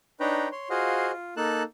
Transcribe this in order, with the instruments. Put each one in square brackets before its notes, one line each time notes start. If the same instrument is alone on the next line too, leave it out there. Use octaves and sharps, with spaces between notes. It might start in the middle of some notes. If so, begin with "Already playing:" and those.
[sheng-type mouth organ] D4 D#4 B4 C#5 G5 A#5
C#5 C6
F4 F#4 G#4 C5 D#5 F5
F4
A#3 D#4 A4 A5 F#6